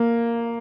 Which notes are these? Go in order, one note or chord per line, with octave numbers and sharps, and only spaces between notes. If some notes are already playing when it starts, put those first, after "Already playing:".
Already playing: A#3